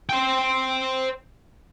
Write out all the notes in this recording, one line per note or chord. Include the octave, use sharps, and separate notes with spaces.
C5 G5